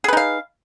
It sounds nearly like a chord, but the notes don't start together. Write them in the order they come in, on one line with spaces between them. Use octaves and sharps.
G#4 B4 D#4 F5